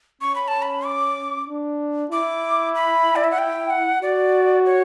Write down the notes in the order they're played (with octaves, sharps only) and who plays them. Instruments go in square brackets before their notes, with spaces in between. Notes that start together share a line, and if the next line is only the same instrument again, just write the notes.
[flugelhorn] C#4 [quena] C#6
[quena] B5
A5
B5
D6
[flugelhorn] D4
[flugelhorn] E4 [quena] D6
[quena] B5
D5
E5
F#5
G5
F#5
[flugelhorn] F#4 [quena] D5
[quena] C#5